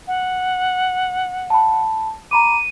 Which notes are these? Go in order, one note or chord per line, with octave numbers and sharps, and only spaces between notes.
F#5
A5 B5
A#5 B5 D6 D#7